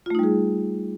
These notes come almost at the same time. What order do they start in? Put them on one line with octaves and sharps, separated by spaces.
F4 A3 D#4 G3 G#4